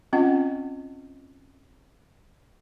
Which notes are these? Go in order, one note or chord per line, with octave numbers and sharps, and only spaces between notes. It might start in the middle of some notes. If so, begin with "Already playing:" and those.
C4 C#4 F4 D#5 F#5